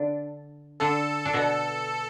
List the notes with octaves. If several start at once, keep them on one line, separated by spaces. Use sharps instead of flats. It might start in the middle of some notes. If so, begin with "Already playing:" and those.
Already playing: D3 D4
D3 D4 A4
D4
B2 B3